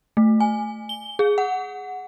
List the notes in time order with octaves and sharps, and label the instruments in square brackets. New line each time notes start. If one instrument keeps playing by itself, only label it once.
[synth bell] A3
G#5
G7
G#4
F#5